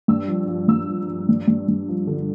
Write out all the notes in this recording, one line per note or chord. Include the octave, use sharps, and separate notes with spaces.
G2 E6
F3
F3
G2 E6
F3
F3
G2
G2
G2
F3
D3